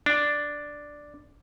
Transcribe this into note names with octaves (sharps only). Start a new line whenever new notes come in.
D4